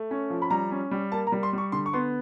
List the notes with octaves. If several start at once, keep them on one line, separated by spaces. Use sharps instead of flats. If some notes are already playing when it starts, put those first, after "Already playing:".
Already playing: A3
C#4
F3
B5
G3 A#5
C#4
G3
A#3 A5
A#5
G3
C6
G3 C#6
D3 C6
C#6
B3 C6